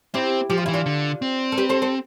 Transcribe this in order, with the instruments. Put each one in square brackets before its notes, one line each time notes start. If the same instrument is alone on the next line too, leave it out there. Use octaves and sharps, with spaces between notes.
[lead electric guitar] C4 [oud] E4 G4
[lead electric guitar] F3 [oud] G4
[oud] F4
[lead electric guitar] E3 [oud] E4
[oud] D4 F4
[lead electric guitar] D3
C4
[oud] A4
G4 B4
A4 C5
A4 C5